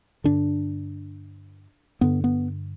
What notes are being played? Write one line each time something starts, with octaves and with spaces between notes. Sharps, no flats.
G2 D3 D4
G2 D3 B3
B3